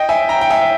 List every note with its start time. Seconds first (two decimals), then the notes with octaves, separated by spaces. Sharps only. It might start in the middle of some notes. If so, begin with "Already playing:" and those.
Already playing: D#5 G5
0.09 E5 G#5
0.29 G5 A#5
0.41 G5
0.50 E5 G#5